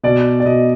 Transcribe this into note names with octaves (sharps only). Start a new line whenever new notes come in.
B2 D5
D5
B2 D#5